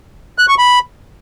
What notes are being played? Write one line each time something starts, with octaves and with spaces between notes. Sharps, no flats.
F#6
C#6
B5